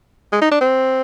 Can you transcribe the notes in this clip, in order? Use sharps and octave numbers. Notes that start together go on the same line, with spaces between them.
G#3
D#4
D4
C4